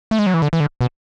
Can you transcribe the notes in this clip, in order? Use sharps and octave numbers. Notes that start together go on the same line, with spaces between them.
A3
G#3
F#3
E3
D3
E3
D3
B2